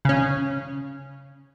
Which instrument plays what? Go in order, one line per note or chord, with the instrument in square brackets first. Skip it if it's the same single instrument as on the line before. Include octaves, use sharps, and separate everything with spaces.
[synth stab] C#3 C#4